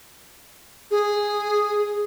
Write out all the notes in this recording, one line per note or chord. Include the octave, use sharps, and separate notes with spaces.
G#4